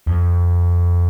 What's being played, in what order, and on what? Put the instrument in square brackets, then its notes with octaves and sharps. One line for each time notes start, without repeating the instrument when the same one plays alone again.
[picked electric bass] F2